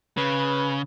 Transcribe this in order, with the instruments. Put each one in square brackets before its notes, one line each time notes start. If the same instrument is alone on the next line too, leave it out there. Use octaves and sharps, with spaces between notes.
[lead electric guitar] C#3 [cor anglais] B4